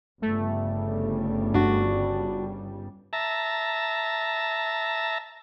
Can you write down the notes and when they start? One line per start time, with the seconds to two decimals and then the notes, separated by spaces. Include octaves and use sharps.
0.22 G1 C#3 G3 A3
1.54 D4 F#4
3.13 E5 A5 A#5